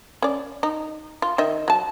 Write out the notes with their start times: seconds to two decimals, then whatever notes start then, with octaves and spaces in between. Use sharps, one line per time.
0.22 C#4 D5
0.63 D#4
1.22 F4
1.38 D#3 D#5 E5
1.68 F#3 A5